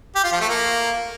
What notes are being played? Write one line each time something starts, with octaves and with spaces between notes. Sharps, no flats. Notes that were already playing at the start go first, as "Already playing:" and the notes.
G4
F4
F3
A3
A#3